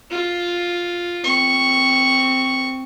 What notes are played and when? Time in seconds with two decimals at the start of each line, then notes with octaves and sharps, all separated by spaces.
0.11 F4
1.24 C4 C#6